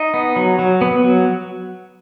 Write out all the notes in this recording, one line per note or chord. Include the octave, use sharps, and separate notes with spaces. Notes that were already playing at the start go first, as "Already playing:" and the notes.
Already playing: D#4 D#5
B3
F#3
F#3
B3
F#3